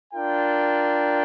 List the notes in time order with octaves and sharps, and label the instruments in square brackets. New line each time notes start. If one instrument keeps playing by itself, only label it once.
[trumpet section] D4 F4 A#4 G5